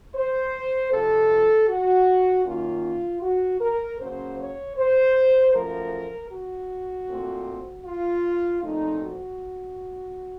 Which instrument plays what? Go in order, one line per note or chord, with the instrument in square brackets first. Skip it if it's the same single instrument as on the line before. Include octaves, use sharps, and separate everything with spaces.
[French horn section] C5
F2 C3 F3 A4
F#4
F#2 D#3 A#3 C#4 F4
F#4
A#4
C#3 F#3 A#3 C#4 C5
C#5
C5
F#2 F3 A3 A#4
F#4
A#2 A3 C4
F4
A#2 F3 A3 C4 D#4
F#4